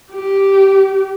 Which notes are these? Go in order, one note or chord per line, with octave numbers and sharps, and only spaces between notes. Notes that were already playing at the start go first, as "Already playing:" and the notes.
G4